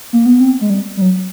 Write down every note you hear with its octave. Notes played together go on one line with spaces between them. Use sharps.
A#3
B3
C4
G#3
G3
G3
F#3